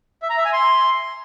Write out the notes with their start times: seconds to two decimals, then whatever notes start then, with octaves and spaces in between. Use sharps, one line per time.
0.22 E5
0.30 A#5
0.37 E5
0.45 G#5
0.53 C6